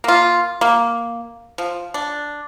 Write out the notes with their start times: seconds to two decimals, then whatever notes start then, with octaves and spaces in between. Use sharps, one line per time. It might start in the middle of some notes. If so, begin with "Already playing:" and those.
0.04 A#3 F4
0.61 A#3
1.58 F3
1.94 D4